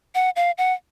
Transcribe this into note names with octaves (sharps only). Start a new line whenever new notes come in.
F#5
F5
F#5